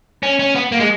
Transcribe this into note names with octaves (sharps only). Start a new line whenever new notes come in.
C#4
C#4
B3
A#3
G#3